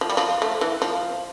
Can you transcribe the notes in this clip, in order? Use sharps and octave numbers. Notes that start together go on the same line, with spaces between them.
F3
G3
F3
A3
E3
F3